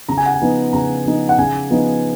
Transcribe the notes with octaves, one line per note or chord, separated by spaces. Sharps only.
C#3 A#5
G#5
F#5
G#5
F3 B3 D#4
C#3 A#5
F3 B3 D#4
F#5
C#3 G#5
F3 B3 D#4